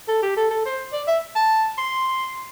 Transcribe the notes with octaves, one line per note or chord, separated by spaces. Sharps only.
A4
G4
A4
A4
C5
D5
E5
A5
C6